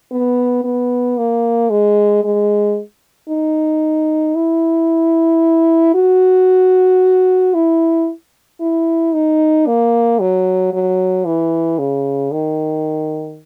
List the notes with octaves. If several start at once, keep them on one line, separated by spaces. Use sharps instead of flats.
B3
B3
A#3
G#3
G#3
D#4
E4
F#4
E4
E4
D#4
A#3
F#3
F#3
E3
C#3
D#3